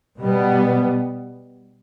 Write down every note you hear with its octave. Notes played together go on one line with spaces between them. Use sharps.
B2 G3 B3